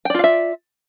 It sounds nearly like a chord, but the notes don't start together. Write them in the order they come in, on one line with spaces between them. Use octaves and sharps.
G5 D5 F4 F5 E5